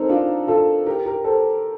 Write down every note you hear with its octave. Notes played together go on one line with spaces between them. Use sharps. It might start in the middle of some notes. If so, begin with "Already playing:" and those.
Already playing: C4 D#4 A4 A#4
D4 F4
F4 A4
G4 A#4
G4 A#4
A4 C5